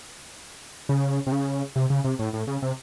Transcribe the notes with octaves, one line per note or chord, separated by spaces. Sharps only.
C#3
C3
C#3
C3
C#3
C3
A2
A2
C#3
C3